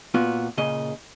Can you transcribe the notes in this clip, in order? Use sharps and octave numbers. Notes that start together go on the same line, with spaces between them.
A#2 B3 F4 F#4
A#2 C#3 D#5